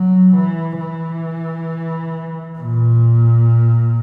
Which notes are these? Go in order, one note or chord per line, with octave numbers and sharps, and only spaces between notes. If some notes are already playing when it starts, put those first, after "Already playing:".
Already playing: F#3
E3
E3
A#2